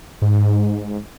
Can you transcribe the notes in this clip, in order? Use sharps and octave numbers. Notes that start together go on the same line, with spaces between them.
G#2